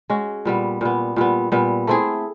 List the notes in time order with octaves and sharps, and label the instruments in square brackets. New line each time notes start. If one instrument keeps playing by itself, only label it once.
[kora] G#3 C#4 F#4
A#2 G3 B3
A#2 G3 B3
A#2 G3 B3
A#2 G3 B3
A3 C4 E4 G#4